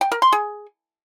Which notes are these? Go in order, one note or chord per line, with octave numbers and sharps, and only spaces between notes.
G5
A#4
C6
G#4